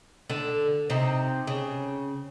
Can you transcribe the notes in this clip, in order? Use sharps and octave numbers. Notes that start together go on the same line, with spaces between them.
D3
C3 D#4
C#3